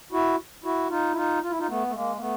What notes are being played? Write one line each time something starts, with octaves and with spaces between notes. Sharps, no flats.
E4 F#4
E4 F#4
D#4 F4
E4
D#4 F4
F4
E4
D#4 F4
A3 B3
A3
G#3 A#3
A#3
A3 B3